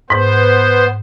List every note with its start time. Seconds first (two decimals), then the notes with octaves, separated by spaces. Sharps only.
0.10 G#2 B3 C5